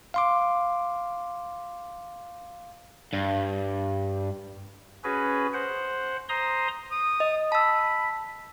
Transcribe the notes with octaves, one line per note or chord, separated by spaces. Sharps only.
F5 C6 D6
G2
C#4 F#4 G#4 B4
C5 F#5
C5 A#5 C6 D#6
D#6
D#5
A5 B5 E6